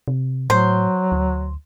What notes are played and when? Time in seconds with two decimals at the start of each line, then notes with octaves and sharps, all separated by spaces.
0.08 C3
0.50 A2 F#3 C5
1.12 D2